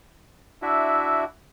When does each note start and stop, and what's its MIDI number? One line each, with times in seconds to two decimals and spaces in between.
0.62 1.24 62
0.62 1.24 64
0.62 1.24 66
0.62 1.24 76